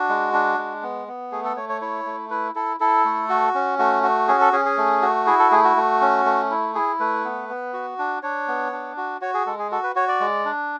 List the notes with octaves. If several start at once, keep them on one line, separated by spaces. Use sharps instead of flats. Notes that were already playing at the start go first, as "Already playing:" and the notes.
Already playing: D4 F#4
G#3
D4
G#3
B3
B3
A3 G#4
A4
A3 C#5
C#5
E4 C#5
A3
E4 B4
E4 A4
E4 A4
A3
F#4
C#4
A3 F#4
F#4
C#4 G#4
A4
C#4 G#4
G#4
A3
F#4
E4 G#4
A4
A3 G#4
F#4
A3
C#4
A3
E4
E4 G#4
A3 B4
B3
B3
F#4
D4
D4 C#5
B3
D4
F#4
F#4 C#5
G#4
G#3 A4
G#4
F#4 A4
B4
F#4 C#5
D5
G#3
D4